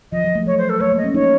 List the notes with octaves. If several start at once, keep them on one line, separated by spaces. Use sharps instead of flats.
F3 D#5
F#3
A3
F#3 C#5
C5
A4
A3 C#5
A#3
D#5
C#4
D#4 C#5